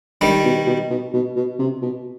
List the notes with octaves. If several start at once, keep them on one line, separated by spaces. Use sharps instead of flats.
G2 D#3 G3
B2
B2
B2
B2
B2
C3
B2